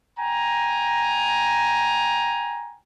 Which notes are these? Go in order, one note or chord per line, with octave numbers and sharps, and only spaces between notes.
G5 G#5 A#5